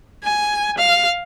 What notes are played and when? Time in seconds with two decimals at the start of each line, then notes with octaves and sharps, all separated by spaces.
0.24 G#5
0.77 F5